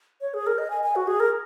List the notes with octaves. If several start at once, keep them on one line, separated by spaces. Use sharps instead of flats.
C#5
G#4
A#4
D#5
G#5
G#5
F#4
G#4
A#4